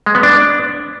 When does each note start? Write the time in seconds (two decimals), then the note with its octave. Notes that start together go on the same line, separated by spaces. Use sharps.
0.06 G#3
0.15 B3
0.23 D4